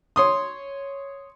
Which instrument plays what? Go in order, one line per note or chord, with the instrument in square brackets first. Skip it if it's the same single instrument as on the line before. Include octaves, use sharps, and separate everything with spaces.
[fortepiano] C#5 C6 D#6